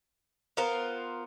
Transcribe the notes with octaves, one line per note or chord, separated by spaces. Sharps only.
B3 F4 A#4 C5